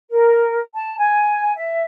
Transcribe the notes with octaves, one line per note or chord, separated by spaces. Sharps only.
A#4
A5
G#5
E5